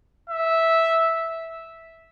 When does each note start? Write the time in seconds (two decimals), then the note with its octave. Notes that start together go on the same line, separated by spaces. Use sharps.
0.30 E5